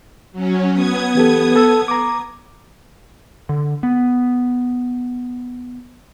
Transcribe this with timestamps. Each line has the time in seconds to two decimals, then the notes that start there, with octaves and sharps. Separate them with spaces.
0.32 F#3 C#4
0.72 B3 D#6 G#6
1.15 E3 G4 A4
1.56 A4 A5 E6
1.88 A#5 D6
3.49 D3
3.83 B3